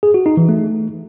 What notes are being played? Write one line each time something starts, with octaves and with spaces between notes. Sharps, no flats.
G#4
F#4
D#4
E3
A3